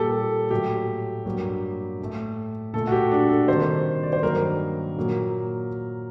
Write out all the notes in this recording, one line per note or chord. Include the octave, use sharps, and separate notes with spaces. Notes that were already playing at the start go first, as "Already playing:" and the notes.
Already playing: A#2 G3 A#3 G4 A4
A2 F#3 A3 G4
G2 F#3 A#3
A2 A3
A#2 A3 A4
F#4
G4
D4
A4
C3 D#3 G3 A#3 C5
D5
C5
G2 D#3 F#3 A#3 A#4
A#2 F#3 A#3